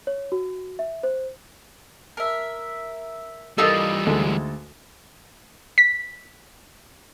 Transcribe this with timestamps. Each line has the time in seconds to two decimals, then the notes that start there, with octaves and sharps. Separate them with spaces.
0.07 C#5
0.32 F#4
0.79 E5
1.03 C5
2.17 A#4 E5
3.58 E3 G3 D#4 F4 A4 A#4 E6
4.06 D2 G#3 A4
5.78 B6